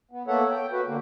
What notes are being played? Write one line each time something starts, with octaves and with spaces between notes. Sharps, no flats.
B3
A#3 B3 A4 C#5 E5 F#5
G5
F#4 B4
D3 A#3